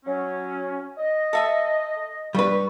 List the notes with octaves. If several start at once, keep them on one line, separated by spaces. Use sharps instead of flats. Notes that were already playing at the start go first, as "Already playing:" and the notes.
F#3 C#4
D#5
A4 E5 D#6
G2 G3 B4 B5 C#6